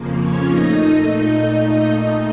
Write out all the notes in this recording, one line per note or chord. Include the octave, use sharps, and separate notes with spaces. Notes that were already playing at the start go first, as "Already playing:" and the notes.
Already playing: F2 C#3 F3 A#3
C#4 C#5
A#2 A3 D#4 D#5